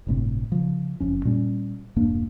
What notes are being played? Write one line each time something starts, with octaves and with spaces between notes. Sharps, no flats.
G1 A2 C3
C#3 F3
F#1 F2 C#4
A#2 G3 C#4
E1 G2 A#3 D4